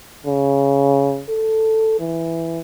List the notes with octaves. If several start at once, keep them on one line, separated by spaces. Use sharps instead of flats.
C#3
A4
E3